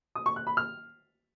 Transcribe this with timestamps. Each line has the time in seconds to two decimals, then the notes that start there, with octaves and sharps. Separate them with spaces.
0.15 D#6
0.26 C#6
0.36 F#6
0.47 B5
0.57 F6